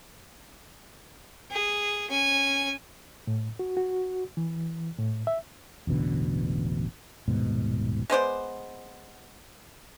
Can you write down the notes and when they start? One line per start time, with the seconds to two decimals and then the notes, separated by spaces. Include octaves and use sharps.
1.51 G#4
2.10 C#4 G#5
3.27 A2
3.59 F#4
3.77 F#4
4.37 E3
4.98 A2
5.27 E5
5.87 E1 A1 B2 D3
7.28 D#1 G#2 B2
8.10 G#3 B3 C5 D5